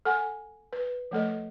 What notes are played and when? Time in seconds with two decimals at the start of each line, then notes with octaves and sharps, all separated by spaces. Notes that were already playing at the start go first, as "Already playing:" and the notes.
0.05 A4 F#5 G#5
0.73 B4
1.11 F3 A3 A4 D#5